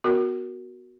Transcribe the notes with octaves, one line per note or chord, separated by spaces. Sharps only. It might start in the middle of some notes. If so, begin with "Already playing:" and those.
B3 F#4 A#4